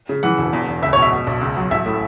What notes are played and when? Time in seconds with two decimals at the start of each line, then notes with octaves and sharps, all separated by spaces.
0.09 C#3
0.23 E3 F#5
0.38 E1
0.53 E2
0.67 E2
0.82 C#2 E5
0.93 C#5
0.97 B2
1.02 E5
1.12 B2
1.27 B1
1.41 C#2
1.57 F#3
1.71 A1 E5
1.86 A2